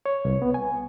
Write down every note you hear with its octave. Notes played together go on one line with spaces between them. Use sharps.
C#5
C2
B3
G#5